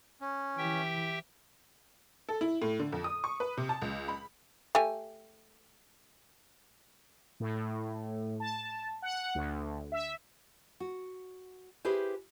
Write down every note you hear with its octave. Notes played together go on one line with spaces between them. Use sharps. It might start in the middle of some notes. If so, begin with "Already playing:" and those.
C#4
E3 G4 E5 G5
A4
E4
A2
D3
F2
D#6
C#6
B4
C3
A5
C#2
B5
A3 G4 G#5
A2
A5
F#5
D2
E5
F#4
E4 G4 G#4 B4 C5